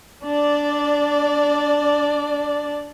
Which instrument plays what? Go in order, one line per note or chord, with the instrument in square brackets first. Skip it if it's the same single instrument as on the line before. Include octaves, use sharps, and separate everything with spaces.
[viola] D4 D5